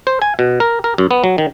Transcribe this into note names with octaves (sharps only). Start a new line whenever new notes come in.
C5
G#5
B2
A#4
A#4
F#2
B3
F#3
D#3